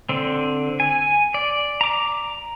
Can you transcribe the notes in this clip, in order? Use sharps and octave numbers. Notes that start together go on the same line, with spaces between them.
D3 C4
G#5
D5
A#5 D6